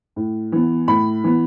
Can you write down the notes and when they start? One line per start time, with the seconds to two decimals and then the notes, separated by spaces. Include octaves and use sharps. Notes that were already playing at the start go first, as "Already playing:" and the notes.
0.16 A2
0.52 E3 B3
0.88 A2 B5
1.24 E3 B3